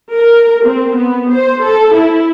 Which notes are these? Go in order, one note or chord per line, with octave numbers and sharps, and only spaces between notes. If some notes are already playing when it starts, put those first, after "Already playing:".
A#4
C4
B3
C5
A4
E4